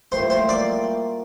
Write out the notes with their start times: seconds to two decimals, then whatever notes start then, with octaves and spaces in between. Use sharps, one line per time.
0.12 A2 G3 A#3 F4 C5
0.30 C5
0.49 D5